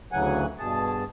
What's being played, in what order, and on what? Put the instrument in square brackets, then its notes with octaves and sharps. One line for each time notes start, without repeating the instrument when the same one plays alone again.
[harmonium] D2 C#3 E3 F#3 F#5 G#5
G2 B2 G#4 A5